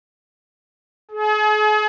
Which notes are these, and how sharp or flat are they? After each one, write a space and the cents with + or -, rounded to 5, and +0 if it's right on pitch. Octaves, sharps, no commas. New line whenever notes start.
G#4 +40